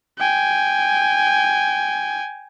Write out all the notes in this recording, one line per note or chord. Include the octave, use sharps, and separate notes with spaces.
G5 G#5